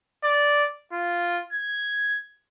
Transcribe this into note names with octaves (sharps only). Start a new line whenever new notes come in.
D5
F4
G#6